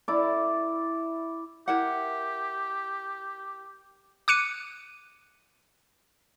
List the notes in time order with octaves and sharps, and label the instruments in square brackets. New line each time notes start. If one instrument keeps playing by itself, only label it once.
[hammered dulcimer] E4 D5
[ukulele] E4 A#4 F#5 [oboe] G4
[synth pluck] D6 F#6 C#7 D#7